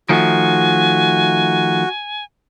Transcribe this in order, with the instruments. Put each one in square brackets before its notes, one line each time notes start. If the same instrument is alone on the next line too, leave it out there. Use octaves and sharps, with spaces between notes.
[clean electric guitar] D#3 F3 A3 [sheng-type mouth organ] F#4 [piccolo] G#5